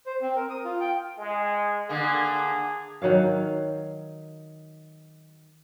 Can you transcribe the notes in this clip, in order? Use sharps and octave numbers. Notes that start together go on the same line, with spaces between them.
C5
C4
A#4
D#6
F4
G5
G#3
D3 A#3 G#4
D#3 F#3 C#5 F5